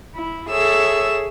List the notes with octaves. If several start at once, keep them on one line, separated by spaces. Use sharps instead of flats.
E4
G#4 A4 C#5 E5 E6